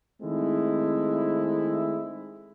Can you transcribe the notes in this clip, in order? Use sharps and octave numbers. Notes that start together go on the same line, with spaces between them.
D#3 G#3 A3 C4 E4